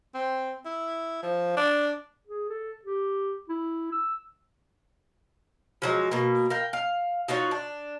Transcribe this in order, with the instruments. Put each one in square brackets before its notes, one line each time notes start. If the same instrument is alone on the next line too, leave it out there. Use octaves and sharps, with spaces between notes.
[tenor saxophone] C4
E4
F3
D4
[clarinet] G#4
A4
G4
E4
E6
[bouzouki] F3 F#3 G#3
B2 A#3
A#4 F5 G5
F5
D#4 F4 F#4 C#5
D4